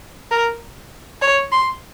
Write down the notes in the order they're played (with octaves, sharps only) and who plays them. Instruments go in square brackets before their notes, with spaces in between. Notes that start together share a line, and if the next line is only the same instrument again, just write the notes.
[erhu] A#4
C#5
C6